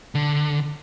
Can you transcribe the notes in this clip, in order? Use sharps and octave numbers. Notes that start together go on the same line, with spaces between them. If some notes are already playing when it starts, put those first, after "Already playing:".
D3